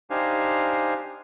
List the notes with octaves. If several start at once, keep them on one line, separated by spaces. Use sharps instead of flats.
D4 D#4 G4 C5 F5 G#5